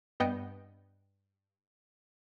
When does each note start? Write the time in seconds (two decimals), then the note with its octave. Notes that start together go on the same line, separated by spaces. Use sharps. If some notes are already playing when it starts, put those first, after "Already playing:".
0.20 G2 B3 D#5 G5 C#7